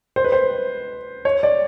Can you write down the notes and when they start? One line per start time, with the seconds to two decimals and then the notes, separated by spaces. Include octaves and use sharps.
0.16 C5
0.24 B4
0.32 C5
1.25 C#5
1.43 D5